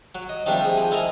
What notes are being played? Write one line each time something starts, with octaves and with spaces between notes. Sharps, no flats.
F#3
D#5
D#3 F3 G3 A3 C4 D4
G#4 G5
F3 G#5 B5
E4 A4 A#4 D#5 G#5 A#5